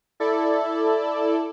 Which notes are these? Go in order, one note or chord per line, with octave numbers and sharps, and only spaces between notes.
E4 A4 D5